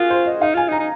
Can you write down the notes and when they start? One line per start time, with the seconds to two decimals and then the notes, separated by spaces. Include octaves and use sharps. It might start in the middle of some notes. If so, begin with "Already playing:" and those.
Already playing: F4 F#4 G#4 A#4
0.10 C5
0.26 D#5
0.42 D#4 F5
0.55 F4 G#5
0.69 D#4
0.72 A#5
0.79 D#4